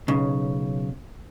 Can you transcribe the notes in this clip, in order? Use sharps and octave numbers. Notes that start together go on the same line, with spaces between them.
B1 C#3